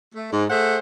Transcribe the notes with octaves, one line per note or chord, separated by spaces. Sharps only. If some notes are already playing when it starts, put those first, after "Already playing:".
A3
G#2
A3 G#4 C5 F#5